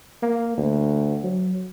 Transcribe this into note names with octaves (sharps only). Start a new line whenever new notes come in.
A#3
D2
F#3